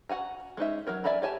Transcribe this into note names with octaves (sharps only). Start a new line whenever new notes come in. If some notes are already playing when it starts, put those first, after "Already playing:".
F#4 F#5 G#5 A#5
G#3 C#4 D#4 E5
F#3 F#4 A#4 C#5
D5 E5 G#5 A#5 B5
G4 C#5 G#5 A5